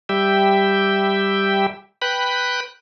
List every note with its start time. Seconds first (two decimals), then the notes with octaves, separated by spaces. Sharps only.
0.09 G3 G4 E5 G5
2.02 B4 G5 B5 F#6